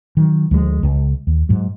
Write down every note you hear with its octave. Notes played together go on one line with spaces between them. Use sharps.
D#3 F#3
D2 F3 F#3 G#3
C#2
D#2
G#2 F#3